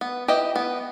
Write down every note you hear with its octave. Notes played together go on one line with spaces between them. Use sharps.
B3
E4 G4 B4 D#5
B3